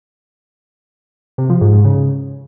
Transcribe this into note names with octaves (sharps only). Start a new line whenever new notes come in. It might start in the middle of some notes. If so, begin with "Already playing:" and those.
C3
F3
G#2
G#2
C#3